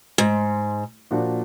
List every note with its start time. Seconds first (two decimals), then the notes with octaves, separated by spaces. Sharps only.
0.18 G#2
1.11 A#2 F3 A#3 D4 F#4